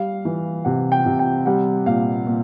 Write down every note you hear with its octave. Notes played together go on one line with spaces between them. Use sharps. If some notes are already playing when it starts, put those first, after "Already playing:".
Already playing: G3 F5
E3
C3 F#5
G5
C3
G5
G3 F#5
A#2 F5
A#2